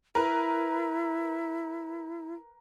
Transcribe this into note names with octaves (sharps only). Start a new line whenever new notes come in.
E4 A#4 B4